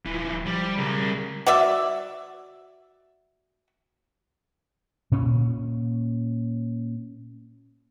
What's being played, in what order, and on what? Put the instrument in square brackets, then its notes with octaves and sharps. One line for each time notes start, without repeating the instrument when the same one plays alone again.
[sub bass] D#1 [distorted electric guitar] E3 F3
[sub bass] F3 [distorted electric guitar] G3
[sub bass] C#3 [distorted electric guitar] G3 A#4
[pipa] F#4 D5 E5
[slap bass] A#2 C#4